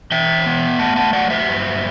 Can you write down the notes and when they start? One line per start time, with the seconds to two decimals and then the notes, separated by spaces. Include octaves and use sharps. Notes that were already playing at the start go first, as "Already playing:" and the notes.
0.12 E3 E5 G5
0.46 B3
0.79 A3 F#5 A5
0.96 F#5 A5
1.13 F#3 D5 F#5
1.30 C5 E5
1.48 G2